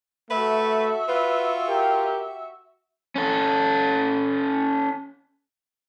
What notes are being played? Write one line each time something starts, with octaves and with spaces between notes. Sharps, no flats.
A3 F#4 B4 E5
F4 B4
G4 A#4
C#4 A4